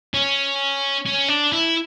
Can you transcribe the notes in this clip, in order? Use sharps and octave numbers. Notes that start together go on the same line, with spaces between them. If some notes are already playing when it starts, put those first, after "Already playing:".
C#4
C#4
D4
E4